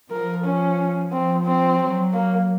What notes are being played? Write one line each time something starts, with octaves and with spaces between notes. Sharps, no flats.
F3 A#4
C#4
F3 C4
C4
F#3
A#3